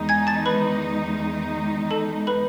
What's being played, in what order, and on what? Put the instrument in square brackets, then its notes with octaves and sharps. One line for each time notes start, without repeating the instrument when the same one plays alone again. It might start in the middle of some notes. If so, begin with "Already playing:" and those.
Already playing: [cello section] E2 D#3 G#3 D#4
[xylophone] G#5 G#6
A5 A6
B4 B5
A4 A5
B4 B5